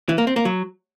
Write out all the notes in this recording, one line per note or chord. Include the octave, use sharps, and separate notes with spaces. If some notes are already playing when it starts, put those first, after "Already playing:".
E3
A#3
C4
A#3
F#3